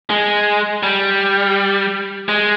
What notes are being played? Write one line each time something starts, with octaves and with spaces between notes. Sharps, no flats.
G#3
G3
G#3